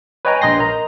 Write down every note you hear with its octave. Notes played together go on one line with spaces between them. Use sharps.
B4 C#5 D#5 G5 G#5 A#5
A#1 D#5 C6 G6 A#6 C7
A#4 D#5 A#5